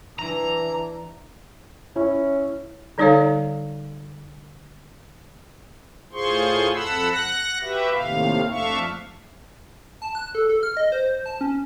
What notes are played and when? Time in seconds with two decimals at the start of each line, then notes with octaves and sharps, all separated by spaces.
0.19 E3 D4 A#5
1.96 C#4 E4
2.98 D3 G3 D#4 A4 C#5 F5
6.13 A2 F4 G#4 C5 C6 C#6
6.72 F2 A4 F#5 B5 E6
7.10 F#5 F#6 A#6
7.61 F#4 G4 B4 E5
7.91 D#2 A2 C3 F5
8.49 F2 A3 D4 E5 F5 C#6
10.02 A5
10.15 F#6
10.35 A4
10.49 A4
10.63 F6
10.77 D#5
10.92 C5
11.26 A5
11.41 C#4